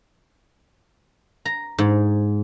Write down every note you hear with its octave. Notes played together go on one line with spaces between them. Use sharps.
A#5
G#2